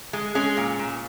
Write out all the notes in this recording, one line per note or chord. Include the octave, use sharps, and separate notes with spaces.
G#3
G#3 C#4
A#2
A#2